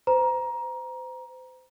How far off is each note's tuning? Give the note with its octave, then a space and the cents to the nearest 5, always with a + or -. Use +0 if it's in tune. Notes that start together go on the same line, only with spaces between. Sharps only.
C5 -35 A#5 +20